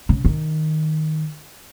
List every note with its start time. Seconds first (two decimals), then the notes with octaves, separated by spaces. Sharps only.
0.09 C#3
0.25 D#3